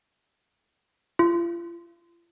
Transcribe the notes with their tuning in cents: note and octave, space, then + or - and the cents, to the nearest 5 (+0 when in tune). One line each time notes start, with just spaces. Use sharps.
F4 -40